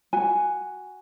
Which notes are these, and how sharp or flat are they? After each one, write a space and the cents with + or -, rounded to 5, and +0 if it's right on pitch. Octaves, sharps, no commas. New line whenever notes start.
F#4 +5 G#5 +0